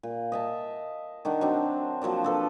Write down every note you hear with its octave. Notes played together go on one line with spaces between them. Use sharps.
A#2
D#5 E5 A5
D#3 D4 D#4 F#5
F#3 C4 D4
F3 F#3 A#3 D4
F3 A4 B4